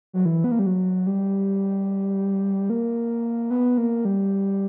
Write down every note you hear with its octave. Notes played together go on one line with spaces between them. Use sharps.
F#3
E3
B3
A#3
G3
F#3
G3
A#3
B3
A#3
G3